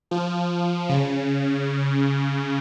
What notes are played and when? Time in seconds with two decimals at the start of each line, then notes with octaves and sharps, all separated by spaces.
0.11 F3
0.89 C#3